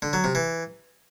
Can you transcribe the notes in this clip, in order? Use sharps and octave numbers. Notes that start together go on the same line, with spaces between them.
D3
F#3
C3
E3